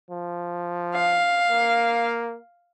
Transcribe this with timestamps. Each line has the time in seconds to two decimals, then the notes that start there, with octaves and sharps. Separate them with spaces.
0.11 F3
0.95 F5
1.51 A#3